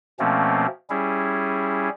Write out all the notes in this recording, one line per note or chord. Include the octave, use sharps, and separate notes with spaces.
B2 F3 A3 A#3 C4 C#4
G3 C#4 E4 G#4